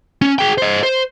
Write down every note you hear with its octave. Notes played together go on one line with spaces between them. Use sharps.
C#4
G#4 G5
C5 D#5
C5